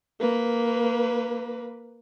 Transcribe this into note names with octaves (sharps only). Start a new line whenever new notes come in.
A#3 B4